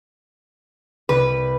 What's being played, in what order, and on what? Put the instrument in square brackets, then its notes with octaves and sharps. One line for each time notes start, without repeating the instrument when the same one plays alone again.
[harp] C2 D#7 [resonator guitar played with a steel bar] B4